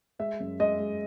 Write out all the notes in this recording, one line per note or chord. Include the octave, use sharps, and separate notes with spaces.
G#3 E5
F#2
G#3 D#5
G#3